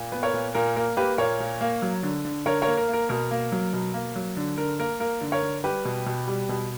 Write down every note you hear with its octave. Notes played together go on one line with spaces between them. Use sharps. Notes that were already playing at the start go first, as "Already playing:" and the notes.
Already playing: A#2
B3
A#4 C#5
A#2
A#2 A#4
A#3 A#4
A#3 G4 B4
A#2 A#4 C#5
A#2
A#3
F#3
D3
D3
D3 A#4 C#5
A#4 C#5
A#3
A#4
A#3
A#4
B2 A#4
A#3
F#3
B2
A#3
F#3
D3
D3 A#4
A#3 A#4
A#3 A#4
D3
A#4 C#5
D3
G3 G4 B4
B2
B2
G3
B2